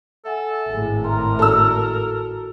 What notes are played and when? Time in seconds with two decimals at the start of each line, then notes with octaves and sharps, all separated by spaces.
0.25 A4 E5 F#5 G#5
0.70 G#1 A2 G#4 G#5
1.04 A#4 E5 A#5 C6
1.39 F#4 A4 E6